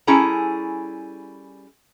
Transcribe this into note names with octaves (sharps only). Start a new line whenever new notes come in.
G3 C#4 E4 G#4 A4 A#5